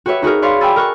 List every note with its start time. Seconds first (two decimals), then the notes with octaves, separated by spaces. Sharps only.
0.06 F#4 G4 B4 C#5 E5
0.22 D#4 F#4 G#4 A#4
0.42 B4 C#5 D5 F5 C6
0.61 G5 G#5 B5 D6 E6 A6
0.76 A#4 C#6 F#6